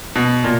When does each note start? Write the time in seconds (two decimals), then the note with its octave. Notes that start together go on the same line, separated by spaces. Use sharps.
0.16 B2
0.44 A#2